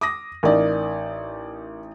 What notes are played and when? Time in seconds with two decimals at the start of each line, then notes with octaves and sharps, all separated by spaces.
0.01 D6 D#6 A#6
0.43 A1 D#4 A#4 D5